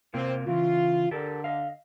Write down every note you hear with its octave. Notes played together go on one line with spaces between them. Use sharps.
C3 A#3 C4 F4
C#3 E3 F4
D3 G4 A4 A#4
D#5 F5